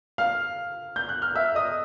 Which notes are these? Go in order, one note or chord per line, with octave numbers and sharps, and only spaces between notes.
F5 F6
G6
F#6
F6
E5 E6
D#5 D#6